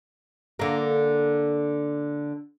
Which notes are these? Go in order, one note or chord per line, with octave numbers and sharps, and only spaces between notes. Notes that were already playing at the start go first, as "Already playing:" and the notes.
D3 A#3